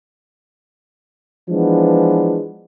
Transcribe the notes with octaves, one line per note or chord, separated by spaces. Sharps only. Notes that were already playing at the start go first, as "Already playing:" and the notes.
E3 F3 G#3 B3 D4